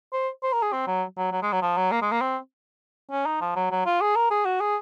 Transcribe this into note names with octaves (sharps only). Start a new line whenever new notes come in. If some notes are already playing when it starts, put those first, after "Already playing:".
C5
C5
A#4
G#4
C4
F#3
F#3
F#3
G#3
F#3
F3
F#3
A#3
G#3
A#3
C4
C#4
D#4
F3
F#3
F#3
F4
G#4
A#4
G#4
F#4
G#4